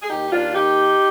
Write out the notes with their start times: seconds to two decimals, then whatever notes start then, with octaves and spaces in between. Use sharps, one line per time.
0.03 G#4
0.10 D#2 D#4 G4
0.28 D#4
0.32 D#2 D4 F4
0.55 D#2 D#4 G4
0.77 D#3